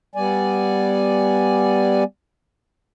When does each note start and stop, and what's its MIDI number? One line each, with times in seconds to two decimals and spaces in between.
0.15 2.04 55
0.15 2.04 59
0.15 2.04 74
0.15 2.04 80